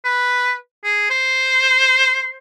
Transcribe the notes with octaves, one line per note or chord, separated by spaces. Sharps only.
B4
G#4
C5